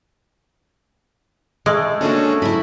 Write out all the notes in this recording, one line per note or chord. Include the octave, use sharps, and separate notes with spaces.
G#3 A3 D5
A#3 C#4 D4 F#4 G#4 A4
G#2 F#3 E4 B5